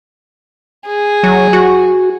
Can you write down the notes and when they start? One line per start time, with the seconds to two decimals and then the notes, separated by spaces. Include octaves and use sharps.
0.86 G#4
1.23 F#3
1.53 F#4